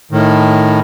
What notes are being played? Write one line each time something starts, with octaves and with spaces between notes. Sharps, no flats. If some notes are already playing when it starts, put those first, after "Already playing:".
A2 D#3